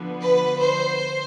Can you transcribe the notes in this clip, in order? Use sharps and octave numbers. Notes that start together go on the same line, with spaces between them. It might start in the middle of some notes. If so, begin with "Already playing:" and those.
Already playing: D3 F3 B3
B4
C5